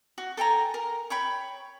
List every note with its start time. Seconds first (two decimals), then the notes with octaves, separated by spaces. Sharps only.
0.18 F#4
0.37 A4 G5 G#5 A#5
0.74 A#4
1.10 C#5 G5 B5